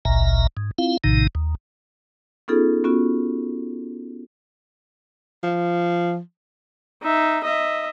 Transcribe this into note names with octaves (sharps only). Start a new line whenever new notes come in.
G#1 C#2 A#2 E5 A#5
G#2
C4 E4 F4 F5
A#1 A2 C3 D#3 D#4
D#2
B3 C#4 D#4 F4 G#4 A4
B3 C#4 F4 F#4
F3
D#4 E5
D#5 E5